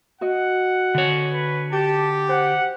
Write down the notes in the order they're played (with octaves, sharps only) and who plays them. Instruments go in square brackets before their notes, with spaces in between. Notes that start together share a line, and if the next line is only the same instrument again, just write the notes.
[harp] F#4 D#5 [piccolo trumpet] F#5
[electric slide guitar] D3 C#5
[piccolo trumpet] B4
[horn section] G4 [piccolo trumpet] A5
[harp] C5 [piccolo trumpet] F#5